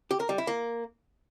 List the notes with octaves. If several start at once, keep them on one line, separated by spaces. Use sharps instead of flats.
G4
A#4
G3
E4
A#3